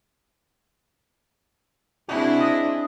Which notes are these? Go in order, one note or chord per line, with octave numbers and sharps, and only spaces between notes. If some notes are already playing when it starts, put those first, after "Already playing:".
C3 C4 D4 E4 F#4 G#4
D#5